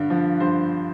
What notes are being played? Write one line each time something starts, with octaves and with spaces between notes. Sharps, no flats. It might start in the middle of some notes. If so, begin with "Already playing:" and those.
Already playing: G2 D3
F3
G2 C5